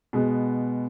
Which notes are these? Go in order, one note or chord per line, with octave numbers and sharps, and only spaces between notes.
B2 G#3 B3